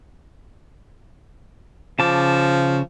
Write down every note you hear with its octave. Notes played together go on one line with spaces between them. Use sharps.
C#3 F3 A5 D6